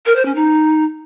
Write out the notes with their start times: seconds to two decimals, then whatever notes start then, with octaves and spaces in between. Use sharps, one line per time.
0.06 A#4
0.16 C5
0.26 C#4
0.35 D#4